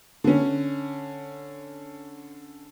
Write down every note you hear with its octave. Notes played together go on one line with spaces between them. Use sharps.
D3 C#4